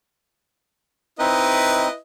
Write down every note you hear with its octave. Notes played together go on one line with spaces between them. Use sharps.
C4 D#4 E4 B4 D#5